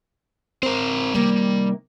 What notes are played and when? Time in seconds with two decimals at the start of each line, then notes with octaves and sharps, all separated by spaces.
0.63 C4 A#4 C5
1.14 C3 D#3 G3 A#3